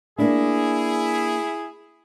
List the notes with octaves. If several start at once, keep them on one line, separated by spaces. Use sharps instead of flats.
A#3 D4 E4 G#4